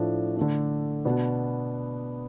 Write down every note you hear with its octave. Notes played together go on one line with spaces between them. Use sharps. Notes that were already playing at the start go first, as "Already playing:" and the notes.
Already playing: A2 F3 A3 D4
D3 A3 D4
B2 B3 D4